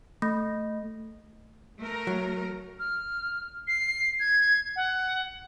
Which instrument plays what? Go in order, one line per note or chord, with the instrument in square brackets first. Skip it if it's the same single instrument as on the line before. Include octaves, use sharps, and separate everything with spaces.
[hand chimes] A3
[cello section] A3 A#4
[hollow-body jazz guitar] F#3
[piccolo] F6
C7
G#6
F#5